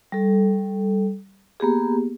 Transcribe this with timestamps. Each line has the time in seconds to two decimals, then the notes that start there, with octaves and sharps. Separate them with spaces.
0.12 G3 A4
1.60 A#3 B3 G4 G#4